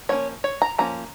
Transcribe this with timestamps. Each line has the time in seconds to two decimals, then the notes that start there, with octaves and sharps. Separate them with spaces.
0.09 F3 A#3 C#4 C#5
0.44 C#5
0.62 A#5
0.78 F3 A#3 C#4 A#5